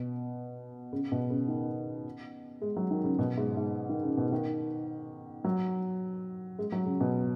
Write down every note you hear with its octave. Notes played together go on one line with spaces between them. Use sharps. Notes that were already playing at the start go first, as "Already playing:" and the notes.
Already playing: B2
C#3
B2
C#3
D#3
G#3
F#3
D#3
C#3
B2
G#2
G#2
D#3
C#3
B2
D#3
F#3
G#3
F#3
C#3
B2